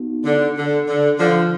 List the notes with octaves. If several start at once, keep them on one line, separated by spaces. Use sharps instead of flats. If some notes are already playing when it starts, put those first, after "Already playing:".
Already playing: B3 D#4 F#4
D3
D3
D3
D3 F3